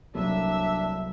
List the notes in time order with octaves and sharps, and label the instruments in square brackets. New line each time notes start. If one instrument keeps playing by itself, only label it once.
[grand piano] C2 A#3 [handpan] F#3 A4 [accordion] D4 [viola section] E5